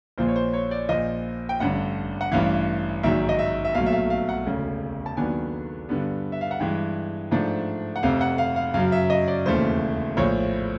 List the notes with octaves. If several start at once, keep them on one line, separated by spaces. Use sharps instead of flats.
A#1 A#2 F3 C5
C#5
C5
C#5
D5
A#1 A#2 F3 D#5
G5
A1 G2 D3 F#5
F#5
A1 G2 E3 F5
A#1 G#2 D#3 F#3 E5
D#5
E5
E5
B1 A#2 F#3 A3 F5
E5
F5
F5
F#5
E1 D2 C#3
A5
D#2 D#3 F#3 B3 D4 G#5
G2 D3 G3 B3
E5
F5
F#5
G2 E3 G#3 G5
G#2 F3 A3 D4
F#5
F1 F2 C3 F5
F#5
F5
F5
F#2 C#3 F#3 F5
E5
D#5
D5
E1 D#2 C#3 E3 A3 C5
A#1 A2 F3 C#5